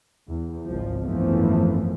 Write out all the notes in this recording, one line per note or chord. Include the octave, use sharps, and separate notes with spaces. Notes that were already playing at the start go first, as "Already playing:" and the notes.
E2
G#1 C#2 F3
G#1 F#2 E3 F3 A3 B3